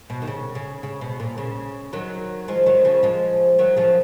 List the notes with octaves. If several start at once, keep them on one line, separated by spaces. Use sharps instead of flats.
B2
D#3
C#3
C#3
C#3
B2
A#2
C#3
D#3 F#3
F3 G#3
D#3 F#3
C#3 F3
F3 G#3
D#3 F#3
C#3 F3